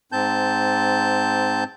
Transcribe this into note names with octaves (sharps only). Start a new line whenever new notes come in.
G#2 C4 A5 G6